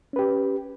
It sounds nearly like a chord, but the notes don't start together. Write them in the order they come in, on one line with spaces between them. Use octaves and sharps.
C#4 B4 G4